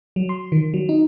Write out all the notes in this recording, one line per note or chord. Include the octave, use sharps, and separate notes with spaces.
F#3
C6
D#3
F#3
D#4